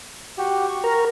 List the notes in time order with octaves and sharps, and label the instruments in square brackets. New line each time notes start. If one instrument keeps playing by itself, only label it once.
[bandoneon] F#4 G4
C#6
[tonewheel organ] A#4